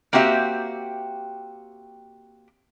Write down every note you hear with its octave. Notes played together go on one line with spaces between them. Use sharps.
A#3 C4 F#4 G4 E5